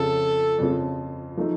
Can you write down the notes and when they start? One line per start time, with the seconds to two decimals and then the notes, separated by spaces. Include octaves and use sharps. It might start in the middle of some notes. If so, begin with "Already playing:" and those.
Already playing: F2 C#3 F3 A4
0.59 F2 C#3 F3
1.37 F3 A3 D#4 A4